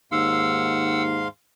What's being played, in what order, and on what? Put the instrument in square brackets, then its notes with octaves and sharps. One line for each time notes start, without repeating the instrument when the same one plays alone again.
[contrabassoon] D#2 [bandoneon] G#2 F5 C6 [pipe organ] F#5 E6